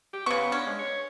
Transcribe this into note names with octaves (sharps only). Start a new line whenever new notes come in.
G4
C#3 B3 C#6
C#4 D4
G#3
C#5